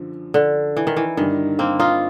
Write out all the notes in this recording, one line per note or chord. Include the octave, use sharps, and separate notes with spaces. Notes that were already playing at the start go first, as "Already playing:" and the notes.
Already playing: F#2 D3 F3
D3
E3
D#3
E3
G2 D3 D#3 G3
A#3 C4
D#4 F4